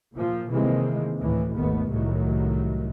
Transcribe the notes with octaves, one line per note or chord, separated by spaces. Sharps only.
A#2 F3
C3 D#3 E3 G#3 A#3 C4
D2 A2 E3
G#1 D#2 D#3 A3 B3
C2 A2 D#3 F#3 A3